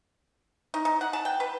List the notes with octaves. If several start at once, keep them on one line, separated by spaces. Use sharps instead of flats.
D#4
D#4
F#5
A5
G5
B4